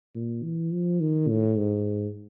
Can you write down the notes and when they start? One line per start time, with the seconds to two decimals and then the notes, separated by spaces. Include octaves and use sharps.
0.15 A#2
0.43 E3
0.72 F3
1.01 D#3
1.29 A2
1.58 G#2